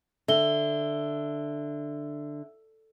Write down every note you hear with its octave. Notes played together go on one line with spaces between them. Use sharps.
D3 E5 G7